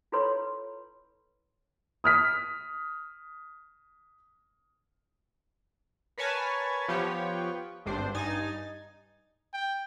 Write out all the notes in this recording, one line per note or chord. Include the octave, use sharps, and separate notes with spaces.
E4 F4 A4 B4 C#5 C6
D#6 F6 B6
A#4 B4 C#5 G#5 A5
F3 B3 G4 C#5
G#1 G2 D4 C5
G2 D#4 G#5 A6
G5